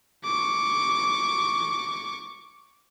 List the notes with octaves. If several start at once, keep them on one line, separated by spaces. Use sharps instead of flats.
C#6 D6